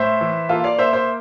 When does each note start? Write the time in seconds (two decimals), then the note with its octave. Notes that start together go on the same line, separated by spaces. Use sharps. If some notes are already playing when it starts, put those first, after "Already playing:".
Already playing: A2 C5 E5
0.21 E3
0.49 A#3 F4 A4
0.64 D5 F5
0.79 A#3 C5 E5
0.93 C5 E5